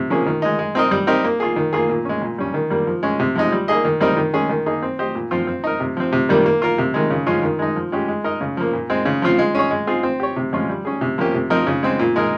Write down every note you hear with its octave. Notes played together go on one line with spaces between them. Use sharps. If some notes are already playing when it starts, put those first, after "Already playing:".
Already playing: C3
F3 A#3 C#4 G#4
D#3
G#3 D#4
G#3
C4 D#4 A#4 D#5
G3
C4 D#4 G4 A#4
A#3
F4 G#4
D#3
A#3 F4 G#4
A#2
G#3 C#4
A#2
G3 C#4
D#3
G3 A#3
F3
G#3 C#4
C3
F3 G#3 D#4
G3
A#3 D#4 G#4 D#5
D#3
G3 C4 D#4 A#4
D#3
G#3 C#4 G#4
D#3
A#3 D#4 G#4
C4
G4 C5 D#5
A#2
F3 C4 F4
C4
D#4 A#4
C3
F3 C4
C3
D#3 G3 A#3
A#3
F4 A#4
C3
D#3 G#3
C#3
F3 G#3 C#4 F4
D#3
G#3 D#4
F3
G#3 C#4 G4
G#3
D#4 A#4 D#5
C#3
F3 A#3
A#2
G#3 C4
C#3
F3 C4 F4 C5
G#3
C#4 G#4 C#5
G#3
C4 F4 G#4
C4
G4 C#5
C3
F3 G#3 C#4 F4
G3
C#4 G#4
C3
F3 A#3 C#4 G4
C3
F3 C4 D#4 A#4
C#3
G#3 C4
A#2
G#3 D#4 A#4